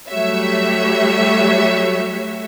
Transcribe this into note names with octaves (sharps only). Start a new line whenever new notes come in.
F#3 G3 A3 F#4 C#5 E5